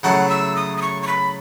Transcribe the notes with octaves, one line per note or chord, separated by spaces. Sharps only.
C#3 F#3 A3 E4 F#5
E6
D#6
D#6
C#6
C#6
B5